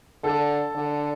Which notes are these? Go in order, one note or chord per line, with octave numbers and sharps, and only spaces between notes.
D3 A4
D3